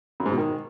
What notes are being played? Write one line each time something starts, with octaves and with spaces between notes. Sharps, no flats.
F#2
G#2
B2
D#3